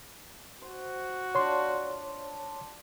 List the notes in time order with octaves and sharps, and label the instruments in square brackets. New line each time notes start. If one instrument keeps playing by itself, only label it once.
[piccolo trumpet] F#4 [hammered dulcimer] C5
[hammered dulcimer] D4 F4 [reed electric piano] C#5 C6